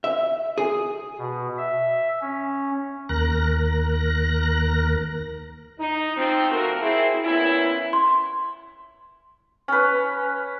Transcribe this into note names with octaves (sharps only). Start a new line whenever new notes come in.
E5
G#4
B2
E5
C#4
D#2 A#4 F#6 A#6
D#4
F3 C4
A3 A#3 F#4 A#4
C4 E4 G#4
A#2 B3 C#4 E4
C6
C#4 B4